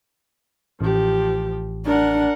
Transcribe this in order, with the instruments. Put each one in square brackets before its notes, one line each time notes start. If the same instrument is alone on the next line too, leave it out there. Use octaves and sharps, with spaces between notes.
[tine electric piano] A1 [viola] F3 G4
[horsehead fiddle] D4 [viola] A#4 F#5